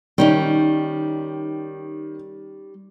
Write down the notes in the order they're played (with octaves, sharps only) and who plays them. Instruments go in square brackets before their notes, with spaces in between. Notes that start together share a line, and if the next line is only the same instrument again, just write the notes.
[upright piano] D#3 [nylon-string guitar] G3 C#4 D#4